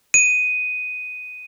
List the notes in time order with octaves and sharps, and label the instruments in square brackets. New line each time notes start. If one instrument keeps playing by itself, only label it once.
[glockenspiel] D#7